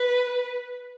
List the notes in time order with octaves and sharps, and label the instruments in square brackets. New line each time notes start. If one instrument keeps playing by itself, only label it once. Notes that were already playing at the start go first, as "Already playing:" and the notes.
Already playing: [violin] B4